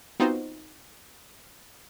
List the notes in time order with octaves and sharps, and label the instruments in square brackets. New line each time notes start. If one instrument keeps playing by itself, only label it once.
[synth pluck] B3 C4 D#4 F4 F#4 C5